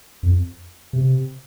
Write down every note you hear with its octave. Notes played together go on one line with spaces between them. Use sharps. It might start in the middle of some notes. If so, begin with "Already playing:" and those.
F2
C3